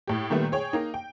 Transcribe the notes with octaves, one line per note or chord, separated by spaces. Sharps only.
A2 G4
A#2 D#3 G3 A3 B3
G#4 C#5 G5
A#3 D#4
G5